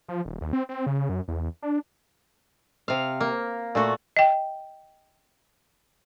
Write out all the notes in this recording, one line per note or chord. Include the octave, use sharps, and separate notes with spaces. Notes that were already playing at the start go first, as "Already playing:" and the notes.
F3
D#1
D#2
C4
C4
C#3
F#2
E2
D4
C3 F5
A#3
A#2 A3 F#4
D#5 G5